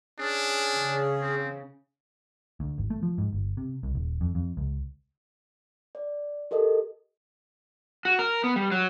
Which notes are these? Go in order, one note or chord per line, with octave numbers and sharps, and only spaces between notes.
C#4 D4 G#4
C#3
C4
D2
G#1
A3
F3
G#2
G1
C3
C2
D#1
F2
F2
C#2
D5
G4 A4 A#4 D#5
F#4
A#4
B3
G3
F#3